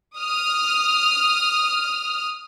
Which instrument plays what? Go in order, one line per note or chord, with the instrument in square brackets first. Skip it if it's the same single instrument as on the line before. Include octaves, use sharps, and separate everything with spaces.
[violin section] D#6 F6